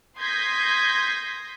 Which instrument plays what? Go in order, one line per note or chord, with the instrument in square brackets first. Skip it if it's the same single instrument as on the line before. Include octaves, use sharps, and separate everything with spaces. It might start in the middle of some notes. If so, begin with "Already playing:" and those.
[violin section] C6 D#6 G6 G#6 A#6 B6